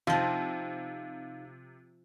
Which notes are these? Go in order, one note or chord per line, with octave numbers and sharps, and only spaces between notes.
C3 F3 C4 D#4 F4 F5